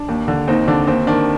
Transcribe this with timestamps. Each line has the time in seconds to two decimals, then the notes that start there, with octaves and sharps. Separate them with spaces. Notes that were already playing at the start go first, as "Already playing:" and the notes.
Already playing: D4
0.08 D#2
0.28 D3
0.48 D#2 C4 D#4
0.68 D3 D4
0.87 D#2 C4
1.07 D#3 D4